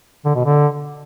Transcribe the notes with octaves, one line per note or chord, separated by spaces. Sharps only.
D3
B2
D3